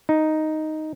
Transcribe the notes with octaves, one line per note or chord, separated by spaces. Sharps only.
D#4